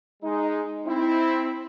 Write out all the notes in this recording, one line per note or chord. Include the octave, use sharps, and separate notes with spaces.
G#3 D#4
C4 E4